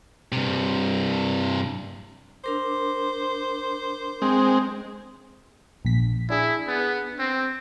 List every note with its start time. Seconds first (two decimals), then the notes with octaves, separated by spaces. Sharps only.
0.32 G2 C3
2.44 D4 A#4 C5 D6
4.22 G#3 C4
5.85 A#1 B6
6.30 D4 E4 G#4
6.68 B3
7.19 C4